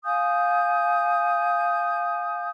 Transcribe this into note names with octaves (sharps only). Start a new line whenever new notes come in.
F5 G#5 D#6 G6